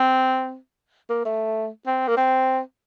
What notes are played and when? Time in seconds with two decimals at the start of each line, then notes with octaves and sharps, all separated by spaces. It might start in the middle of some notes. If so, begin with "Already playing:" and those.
Already playing: C4
1.10 A#3
1.25 A3
1.87 C4
2.08 A#3
2.17 C4